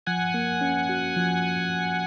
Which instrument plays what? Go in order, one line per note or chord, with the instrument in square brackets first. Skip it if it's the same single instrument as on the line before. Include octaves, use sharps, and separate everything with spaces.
[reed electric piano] F3 [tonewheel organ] F#5 G#5
[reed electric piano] A#3
C#4
F#4
F3